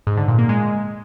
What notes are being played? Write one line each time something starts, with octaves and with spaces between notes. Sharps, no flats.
G#2
D3
A#2
A#3
G#3